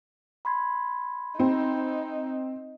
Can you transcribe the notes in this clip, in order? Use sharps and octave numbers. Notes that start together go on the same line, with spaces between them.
B5 C6 G#6
C4 D#4